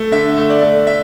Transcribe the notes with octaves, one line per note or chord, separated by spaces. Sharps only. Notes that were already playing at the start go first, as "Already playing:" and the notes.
Already playing: A3
D3 E5
A3
D5
A3
E5